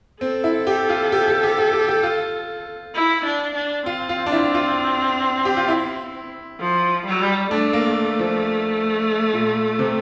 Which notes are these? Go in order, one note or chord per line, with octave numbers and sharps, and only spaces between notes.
C4 A4
E4
G4
F4
G4
G4
G4
G4
G4
G4
F4
E4
D4
D4
C4 F4
F4
D4
E4
F4
G4
F4
E4
F3
G3
A3 D4
A#3
F3
A#2
C3